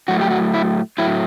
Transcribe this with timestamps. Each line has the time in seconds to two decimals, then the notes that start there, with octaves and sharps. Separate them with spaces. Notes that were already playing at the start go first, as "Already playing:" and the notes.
0.08 A2 F#3 A3 F#4
0.21 G4
0.30 F#4
0.54 E4
0.98 A2 F#3 A3 E4